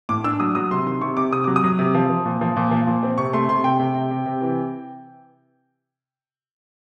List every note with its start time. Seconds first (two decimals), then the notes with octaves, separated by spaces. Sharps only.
0.09 A2 D6
0.24 D4 E6
0.40 F#3 D#6
0.55 F#3 D#6
0.71 C3 C6
0.87 D#3 C6
1.01 C3 C#6
1.17 C3 D6
1.32 C3 D#6
1.44 F#3 D6
1.56 D#6
1.64 F#3
1.79 C3
1.94 F3
2.10 F3
2.25 A#2
2.41 F3
2.56 A#2
2.71 F3
2.87 A#2
3.03 C4
3.18 C3 C#6
3.33 A3 C6
3.49 C3 C6
3.64 C3 G5
3.80 C3
3.95 C3
4.11 C3
4.26 C3
4.41 E3